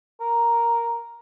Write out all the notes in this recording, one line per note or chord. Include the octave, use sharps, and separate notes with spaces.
A#4